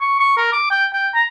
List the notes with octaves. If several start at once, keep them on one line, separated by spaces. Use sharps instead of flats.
C#6
C#6
A#4
D6
G5
G5
A#5